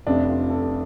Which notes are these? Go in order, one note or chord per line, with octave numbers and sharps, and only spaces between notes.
F1 F2 C3 D4
F4
A4